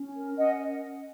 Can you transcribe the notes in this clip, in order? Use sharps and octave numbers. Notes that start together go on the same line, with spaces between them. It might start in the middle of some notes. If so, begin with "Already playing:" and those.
Already playing: C#4
A#4
C#4 D#5 F#5